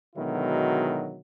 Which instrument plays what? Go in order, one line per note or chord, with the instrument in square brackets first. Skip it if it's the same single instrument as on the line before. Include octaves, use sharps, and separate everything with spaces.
[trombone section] B2 D3 D#3 F#3 G#3 E4